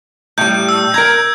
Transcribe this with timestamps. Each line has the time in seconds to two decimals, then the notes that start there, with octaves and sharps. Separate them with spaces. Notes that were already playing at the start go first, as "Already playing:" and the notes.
0.38 A2 G3 G6
0.69 E6
0.94 A#4 A#5 G#6